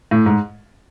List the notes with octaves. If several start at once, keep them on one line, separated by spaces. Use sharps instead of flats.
A2
G#2